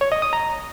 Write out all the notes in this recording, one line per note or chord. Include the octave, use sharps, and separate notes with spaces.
C#5
D#5
D#6
A#5